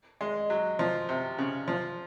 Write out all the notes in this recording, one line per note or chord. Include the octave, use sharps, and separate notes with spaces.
G#3
F#3
F3
C3
C#3
F3